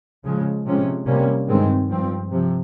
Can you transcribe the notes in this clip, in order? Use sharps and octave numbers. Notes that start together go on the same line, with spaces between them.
C#3 F3 G#3
C3 F3 G#3 C#4
C3 G3 A#3 C#4
G2 D#3 G#3 C4
G2 F3 C4
C3 F3